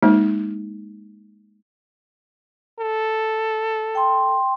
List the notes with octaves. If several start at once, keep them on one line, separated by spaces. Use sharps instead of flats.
G#3 A#3 D#4
A4
G5 C6